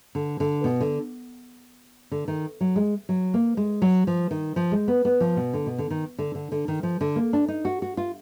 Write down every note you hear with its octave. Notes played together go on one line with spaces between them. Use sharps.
D3
D3
B2
D3
D3
D#3
F#3
G#3
F#3
A#3
G#3
F#3
F3
D#3
F3
G#3
B3
B3
F3
B2
D3
B2
D3
D#3
D3
D3
D3
D#3
F3
D3
A#3
D4
D#4
F#4
F#4
F4